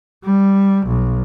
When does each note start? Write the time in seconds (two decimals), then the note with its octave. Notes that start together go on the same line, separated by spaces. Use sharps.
0.24 G3
0.87 B1